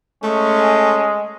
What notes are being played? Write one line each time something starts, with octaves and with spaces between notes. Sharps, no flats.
G#3 A3 C#4